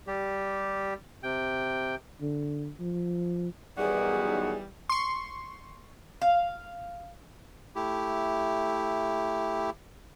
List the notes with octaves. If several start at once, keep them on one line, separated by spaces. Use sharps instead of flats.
G3 G4
C3 G5
D3
F3
B1 F#2 D#3 E3 G3 F#4 G#4
C6 C#6
F5
A3 E4 G4